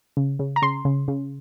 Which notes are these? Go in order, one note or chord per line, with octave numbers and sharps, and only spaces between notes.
C#3
C#3
A#5
C#3 C6
C#3
C#3